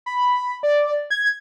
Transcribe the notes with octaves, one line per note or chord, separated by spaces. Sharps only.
B5
D5
G#6